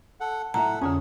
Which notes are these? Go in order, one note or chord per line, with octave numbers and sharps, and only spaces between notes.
A4 F#5
B1 A2 A4 E5 F#5 A#5
F2 D3 C#4 G#4 C#5